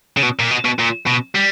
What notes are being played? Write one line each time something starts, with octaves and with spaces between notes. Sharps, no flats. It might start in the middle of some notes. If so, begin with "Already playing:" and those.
C#3
B2
A#2
B2
B2
A#2
B2
G3